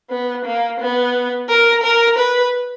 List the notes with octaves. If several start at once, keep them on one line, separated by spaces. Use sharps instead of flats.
B3
A#3
B3
A#4
A#4
B4